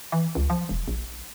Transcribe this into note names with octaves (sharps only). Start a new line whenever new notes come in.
E3
C#2
F3
E1
A#1